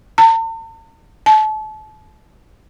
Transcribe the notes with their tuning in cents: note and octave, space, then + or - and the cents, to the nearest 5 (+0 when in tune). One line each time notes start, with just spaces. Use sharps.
A5 +45
A5 -35